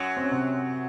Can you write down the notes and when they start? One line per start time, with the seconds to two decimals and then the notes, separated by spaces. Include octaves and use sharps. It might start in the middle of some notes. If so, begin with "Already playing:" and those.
Already playing: F#2 F#3
0.17 C4
0.24 C#4
0.31 C3 C4